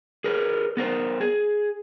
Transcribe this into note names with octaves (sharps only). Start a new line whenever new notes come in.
G#4 A#4 B4
B3 A#4 C5
G#4